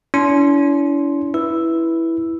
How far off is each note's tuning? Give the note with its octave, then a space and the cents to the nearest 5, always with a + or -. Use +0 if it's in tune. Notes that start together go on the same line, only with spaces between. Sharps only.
C#4 +45 E4 +0 C6 +0
E4 +0 B4 -15 E6 +0